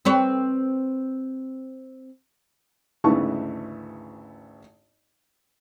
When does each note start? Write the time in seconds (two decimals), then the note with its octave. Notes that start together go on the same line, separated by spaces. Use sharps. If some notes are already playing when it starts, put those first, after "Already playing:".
0.05 C4 B4 C#5
3.04 G#1 D2 C#3 E3 A5 C#6